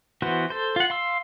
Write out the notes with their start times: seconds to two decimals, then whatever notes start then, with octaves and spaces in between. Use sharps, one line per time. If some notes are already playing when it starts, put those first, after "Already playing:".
0.22 E3 B3 F#4 C5
0.50 A4 C5
0.76 F4 F#5
0.90 F5 C6 E6